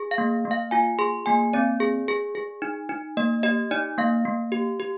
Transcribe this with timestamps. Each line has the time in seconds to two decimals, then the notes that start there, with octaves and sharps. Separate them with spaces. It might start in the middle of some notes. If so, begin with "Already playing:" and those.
Already playing: G#4
0.11 F5
0.18 A#3
0.45 A#3
0.51 F5
0.71 F4 G#5
0.99 G#4 C6
1.26 A#3 G#5
1.53 C4 D5
1.80 G#4
2.08 G#4
2.35 G#4
2.62 D#4
2.89 D#4
3.17 A#3 D#5
3.43 G4 D#5
3.71 D#4 D5
3.98 A#3 F5
4.25 A#3
4.52 G4
4.80 G4